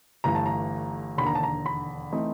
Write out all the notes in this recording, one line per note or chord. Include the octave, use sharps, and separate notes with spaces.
G1 G2 E3 A3 A#5
A5
A#5
E1 D#2 D3 B5
A#5
A5
A#5
B5
E3 A3 C4 D#4